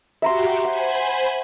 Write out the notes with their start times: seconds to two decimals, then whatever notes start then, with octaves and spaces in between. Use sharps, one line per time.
0.22 F#4 G4 E5 A#5 C6
0.65 C5 F#5 G#5 B5